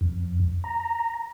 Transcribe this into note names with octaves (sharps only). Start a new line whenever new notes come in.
F2
A#5